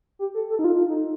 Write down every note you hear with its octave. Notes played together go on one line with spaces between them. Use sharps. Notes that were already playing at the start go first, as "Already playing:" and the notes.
G4
A4
A4
D#4
F4
D#4